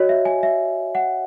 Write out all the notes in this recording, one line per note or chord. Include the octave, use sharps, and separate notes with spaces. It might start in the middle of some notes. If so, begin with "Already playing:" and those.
Already playing: F#4 C#5 D#5
E5
G#5
E5
F#5